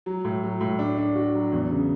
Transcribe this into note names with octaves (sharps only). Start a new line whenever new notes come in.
F#3
A2
F#3
A2
D4
D4
F#4
F#3
E2
C#3